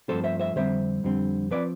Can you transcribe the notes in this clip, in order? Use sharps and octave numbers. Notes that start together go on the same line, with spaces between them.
G2 F3 A3 C4 A4 C5
C5 E5
C5 E5
F2 D3 G3 C4 C5 E5
F2 D3 G3 C4
F3 C4 B4 D5